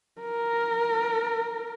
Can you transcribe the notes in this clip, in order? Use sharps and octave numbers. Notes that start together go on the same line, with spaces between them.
A#4